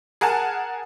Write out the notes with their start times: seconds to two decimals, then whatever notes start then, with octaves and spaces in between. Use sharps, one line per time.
0.21 G#4 A#4 F#5 G#5 A5